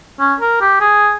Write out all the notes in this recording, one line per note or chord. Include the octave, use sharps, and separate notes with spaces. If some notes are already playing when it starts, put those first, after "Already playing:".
C#4
A#4
G4
G#4